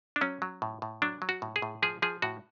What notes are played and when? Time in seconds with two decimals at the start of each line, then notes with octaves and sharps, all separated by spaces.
0.16 D4
0.21 F#3 C#4
0.42 F#3
0.62 A2
0.82 A2
1.02 F#3 D4
1.22 F#3
1.29 F#4
1.42 A2
1.56 G#4
1.62 A2
1.82 F3 G#4
2.02 F3 G#4
2.22 A2 F#4